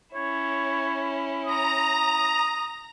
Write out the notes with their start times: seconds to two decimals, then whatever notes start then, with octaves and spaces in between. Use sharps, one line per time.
0.15 C#4 E4 C#5
1.46 A#5 D#6